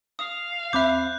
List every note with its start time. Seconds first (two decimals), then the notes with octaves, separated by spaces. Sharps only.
0.19 F5 D#6
0.73 D#2 C4 E5 B5 D6 F#6 G6